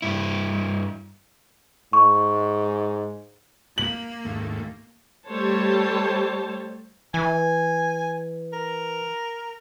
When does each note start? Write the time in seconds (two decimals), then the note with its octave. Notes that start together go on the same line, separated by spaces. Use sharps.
0.02 G2 E4
1.93 G#2 C#6
3.78 A#3 F#7
4.25 D#2 G#2 A3
5.26 G3 A3 C5 C#5 A5
7.14 E3 G#5
8.53 A#4